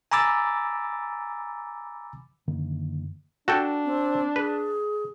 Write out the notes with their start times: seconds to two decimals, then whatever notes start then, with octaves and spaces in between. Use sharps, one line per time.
0.12 G#5 A#5 B5 D6 E6 A6
2.47 F#2 D3 D#3 A#3
3.48 D4 F#4 A4 G5
3.85 C4
4.36 G#4 B4